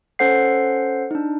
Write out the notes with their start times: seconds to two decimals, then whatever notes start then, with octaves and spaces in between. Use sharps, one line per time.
0.19 C#4 A4 C5 F#5 C7
1.11 D4 D#4